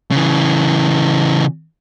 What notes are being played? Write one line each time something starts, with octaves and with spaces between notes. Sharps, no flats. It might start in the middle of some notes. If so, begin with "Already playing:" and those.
C#3 E3